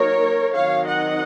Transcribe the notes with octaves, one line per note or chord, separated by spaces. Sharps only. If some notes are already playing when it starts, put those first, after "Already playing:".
Already playing: F#3 A#3 D#4 A#4 C#5
D#3 F#3 C4 D#4 C#5 F5
D#5 F#5